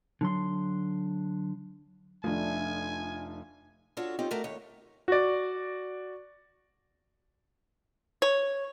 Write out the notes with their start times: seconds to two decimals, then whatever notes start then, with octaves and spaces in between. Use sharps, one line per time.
0.21 D3 F#3 C6
2.24 F1 F3 A3 D4 G#5
3.97 D4 F4 F#4 A4 C#5
4.19 C4 C#4 D#4 F4 G4
4.31 A3 F#4 A#4 D5
4.44 D#2 C#5
5.08 F#4 D5
8.22 C#5